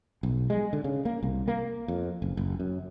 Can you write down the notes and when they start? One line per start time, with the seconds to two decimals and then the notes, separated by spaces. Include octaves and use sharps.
0.23 B1
0.50 G#3
0.73 D3
0.84 C#3
1.05 A#3
1.23 C2
1.48 A#3
1.88 F2
2.22 F#1
2.37 F#1
2.60 F#2